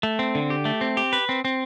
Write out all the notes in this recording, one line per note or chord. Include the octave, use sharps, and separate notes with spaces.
A3
C4
D3
G4
A3
C4
G4
B4
C4
C4